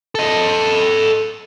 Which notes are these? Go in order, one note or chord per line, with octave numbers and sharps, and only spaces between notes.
A4 D#5